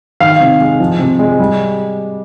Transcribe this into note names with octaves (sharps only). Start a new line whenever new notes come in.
D#3 F5
C3
G#3
F3
C3
G#3
G3